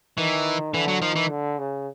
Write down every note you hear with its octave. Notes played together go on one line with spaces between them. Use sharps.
D#3 E3
D3 E3
F#3
D#3 F3
E3
D3
C#3